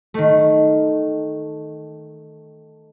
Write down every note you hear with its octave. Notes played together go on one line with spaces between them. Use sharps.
D#3 A3